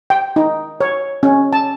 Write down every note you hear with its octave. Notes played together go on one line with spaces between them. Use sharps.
G5
D#4
C#5
C#4
A5